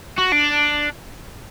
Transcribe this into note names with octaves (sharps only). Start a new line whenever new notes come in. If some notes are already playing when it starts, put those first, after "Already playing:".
F#4
D4